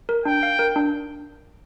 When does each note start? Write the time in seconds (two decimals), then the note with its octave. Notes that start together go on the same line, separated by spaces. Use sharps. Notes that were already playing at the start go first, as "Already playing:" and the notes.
0.09 A#4
0.25 D4 G5
0.43 F5
0.59 A#4
0.76 D4